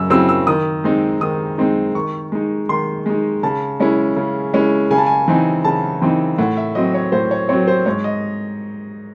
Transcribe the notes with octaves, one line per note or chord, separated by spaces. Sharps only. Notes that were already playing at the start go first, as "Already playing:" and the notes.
Already playing: F#2 C#3 F#3 E6
C#3 F#3 C4 E4 E6
E6
D#3 D#6
G#3 C4 D#4
D#3 D#6
G#3 C4 D#4
D#3 C#6
G#3 D#4
D#3 C6
G#3 D#4
C#3 A5
G#3 C#4 E4
C#3
G#3 C#4 E4
C#3 G#5
A5
G#5
E3 C4 D#4
C#3 A5
E3 C4 D#4
A2 F#5
E5
F#3 C4 D#5
C#5
A2 C5
C#5
F#3 C4 C#5
C5
G#2 C#5
D#5